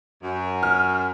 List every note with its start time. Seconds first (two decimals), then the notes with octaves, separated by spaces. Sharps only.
0.23 F#2
0.63 F6